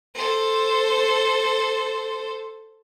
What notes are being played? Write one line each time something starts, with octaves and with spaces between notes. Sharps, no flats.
A4 C5